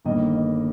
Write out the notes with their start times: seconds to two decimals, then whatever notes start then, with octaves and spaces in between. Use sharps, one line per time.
0.05 G1 G2 D#3 A#3 D#5
0.35 D#5